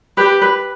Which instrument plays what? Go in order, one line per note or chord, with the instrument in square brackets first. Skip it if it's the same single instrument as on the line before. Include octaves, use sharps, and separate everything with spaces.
[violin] G4 [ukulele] B4
[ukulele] B4